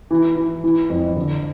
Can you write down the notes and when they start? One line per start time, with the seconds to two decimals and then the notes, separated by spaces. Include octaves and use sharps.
0.11 E3
0.36 E3
0.64 E3
0.90 F2
1.16 D3